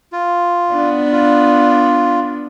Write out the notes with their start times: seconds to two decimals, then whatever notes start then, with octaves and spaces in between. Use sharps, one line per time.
0.13 F4
0.72 B3 D4
1.12 F4